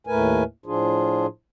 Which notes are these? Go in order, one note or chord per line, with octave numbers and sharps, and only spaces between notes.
D#2 A2 A3 A#4 B4 G#5
A2 F3 D4 F4 G#4